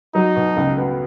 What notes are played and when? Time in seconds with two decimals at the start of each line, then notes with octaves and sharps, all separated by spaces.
0.14 F#3 D#4
0.36 B2
0.57 C#2
0.78 B3